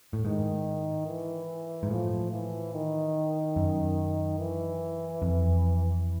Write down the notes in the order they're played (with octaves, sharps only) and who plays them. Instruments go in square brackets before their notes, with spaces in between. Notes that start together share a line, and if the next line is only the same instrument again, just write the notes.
[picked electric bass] A2
[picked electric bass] G#2 [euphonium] D#3
[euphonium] E3
[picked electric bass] G#2
[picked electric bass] A2 [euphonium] F3
[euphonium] E3
D#3
[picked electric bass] F#2
[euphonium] E3
[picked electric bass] F2